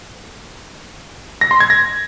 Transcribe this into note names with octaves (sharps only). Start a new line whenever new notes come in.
A#6
C6
G#6
A#6